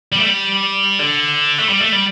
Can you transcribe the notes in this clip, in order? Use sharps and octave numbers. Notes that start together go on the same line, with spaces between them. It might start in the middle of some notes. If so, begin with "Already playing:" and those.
G3
A3
G3
D3
A3
G3
A3
G3